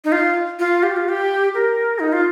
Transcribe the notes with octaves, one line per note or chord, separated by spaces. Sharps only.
D#4
F4
F4
G4
F4
G4
A#4
D#4
F4